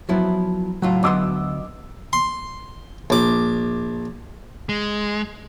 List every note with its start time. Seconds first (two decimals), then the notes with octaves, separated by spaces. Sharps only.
0.09 F3 F#3 B3 E4
0.82 C#2 A2 F#3 F4
1.03 D2 B3 D#5 C6 D6 E6
2.13 C6
3.10 A#1 D6
4.69 G#3